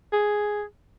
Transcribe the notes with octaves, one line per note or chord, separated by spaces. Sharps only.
G#4